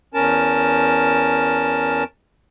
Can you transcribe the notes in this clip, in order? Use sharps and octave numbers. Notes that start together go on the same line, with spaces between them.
E2 C#4 A#4 A5